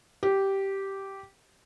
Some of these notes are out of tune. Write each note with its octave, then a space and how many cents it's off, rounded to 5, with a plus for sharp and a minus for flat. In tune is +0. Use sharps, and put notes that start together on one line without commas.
G4 -10